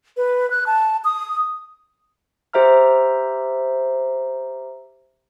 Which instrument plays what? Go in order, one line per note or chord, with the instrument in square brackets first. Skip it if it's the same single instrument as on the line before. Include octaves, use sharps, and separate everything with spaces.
[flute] B4
F#6
A5
D#6
[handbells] G4 C5 E5 A#5 F6